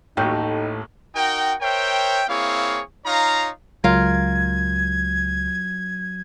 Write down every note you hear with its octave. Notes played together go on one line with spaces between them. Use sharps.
A1 D#2 A2 D#4 F#4 G5 G6
D#4 F#4 A#4 G5
A#4 C5 C#5 E5 G5
A#3 C4 E4 G#4 C#5 F5
D#4 F4 C#5 F5 A#5
C#2 F#3 F4 A#4 G#6